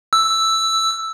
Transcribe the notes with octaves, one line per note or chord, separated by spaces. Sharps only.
E6